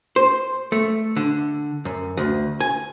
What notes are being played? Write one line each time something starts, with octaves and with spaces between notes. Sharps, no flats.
C5
A3
D3
F#2
D2
G#5